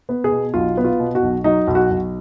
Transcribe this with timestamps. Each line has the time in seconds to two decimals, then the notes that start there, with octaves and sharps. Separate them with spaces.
0.09 B3
0.24 G#4
0.32 B2
0.54 B1 F4
0.77 B3
0.85 F4
1.00 B2
1.15 F#4
1.23 B1
1.44 F#3 D#4
1.67 B1
1.75 F#4
1.91 B1